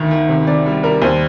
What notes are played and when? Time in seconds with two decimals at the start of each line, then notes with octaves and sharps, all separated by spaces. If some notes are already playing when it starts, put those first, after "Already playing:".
Already playing: D2 D#3
0.11 D#3
0.29 C3
0.47 C3 D5
0.66 G3
0.83 G3 A#4
1.02 D#2 C5